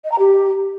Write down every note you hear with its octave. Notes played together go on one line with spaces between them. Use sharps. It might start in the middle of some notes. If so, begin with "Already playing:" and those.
D#5
A#5
G4